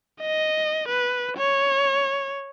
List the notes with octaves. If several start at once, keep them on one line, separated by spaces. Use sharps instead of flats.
D#5
B4
C#5